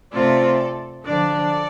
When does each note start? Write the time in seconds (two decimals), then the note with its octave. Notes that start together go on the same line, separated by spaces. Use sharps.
0.12 C3 A3 C4 F4 A4 D5
1.05 D3 F3 D4 A4 D5